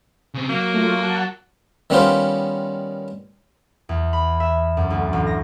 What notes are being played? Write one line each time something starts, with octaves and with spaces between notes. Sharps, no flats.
C#3 C4
F#3 A#3
A3 F4
F#5 A5
D#3 G3 B3 C#4 F4 C5
E2
B5
E5
F#2
D2
A1
A#6